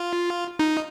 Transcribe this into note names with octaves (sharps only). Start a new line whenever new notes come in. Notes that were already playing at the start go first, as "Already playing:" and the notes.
Already playing: F4
D#4